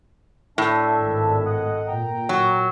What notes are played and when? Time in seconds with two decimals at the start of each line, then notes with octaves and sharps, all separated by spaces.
0.58 A2 D4 E5
0.98 G#1
1.46 D#5 F#5
1.87 A#2 G5 A#5
2.29 F#3